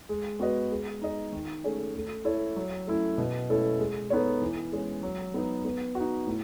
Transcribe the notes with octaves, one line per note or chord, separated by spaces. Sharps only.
G#3
B3 F#4 B4 D#5
G#3
D#4 G#4 D#5
D#3
A3 C#4 G#4 C#5
A3
E4 A4 C#5
F#3
A3 C#4 E4
B2
A3 C#4 E4 A4
G#3
B3 D#4 A4 C#5
E3
G#3 C#4 G#4
F#3
B3 D#4
B3
F#4
D#4
A2